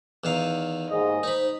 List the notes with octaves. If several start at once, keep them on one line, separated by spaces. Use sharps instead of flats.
E2 D#3 F5
D#2 G#2 D#5
D#4 C5 B5